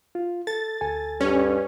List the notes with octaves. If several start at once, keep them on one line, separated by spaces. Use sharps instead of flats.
F4
A4 A6
D2 A4 G#5
G2 C#4